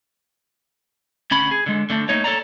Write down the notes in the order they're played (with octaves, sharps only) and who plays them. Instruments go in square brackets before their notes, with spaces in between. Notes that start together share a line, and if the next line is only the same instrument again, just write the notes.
[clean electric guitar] D2 C#4 B5
G#4
D3 G#3
D3 A3 D4
A3 A#3 D#4 C#5
A4 C#5 D5 A#5